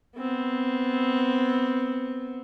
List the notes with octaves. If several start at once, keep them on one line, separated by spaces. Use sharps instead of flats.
B3 C4